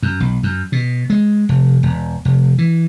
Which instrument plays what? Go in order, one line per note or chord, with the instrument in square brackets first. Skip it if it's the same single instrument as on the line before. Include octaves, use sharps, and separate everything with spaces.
[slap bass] F#2
B1
F#2
B2
G#3
F1
E1
F1
E3